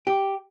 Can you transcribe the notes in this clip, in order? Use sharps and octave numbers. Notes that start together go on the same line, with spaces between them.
G4